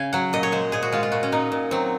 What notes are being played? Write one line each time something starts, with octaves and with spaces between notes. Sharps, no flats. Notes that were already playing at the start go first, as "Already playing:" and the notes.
Already playing: C#3 G#5
F#3 F#5
A#2 D#5
C#5
G#3 C5
A#2 G#4
F#4
G#3 F4
F4
A#2 F#4
C#4
A#2 D#4
A#2
F#3 C4